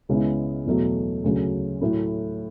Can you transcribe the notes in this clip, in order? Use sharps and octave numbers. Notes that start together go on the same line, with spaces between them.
C#2 C#3 G#3 B3 E4
E2 B2 F#3 A3
D2 C#3 F#3
A2 F#3 A3 E4